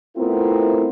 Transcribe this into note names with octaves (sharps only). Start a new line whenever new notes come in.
A3 B3 C4 E4 F4 A#4